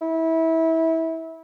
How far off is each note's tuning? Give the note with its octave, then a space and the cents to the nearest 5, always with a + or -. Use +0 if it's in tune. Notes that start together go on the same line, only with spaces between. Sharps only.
E4 -25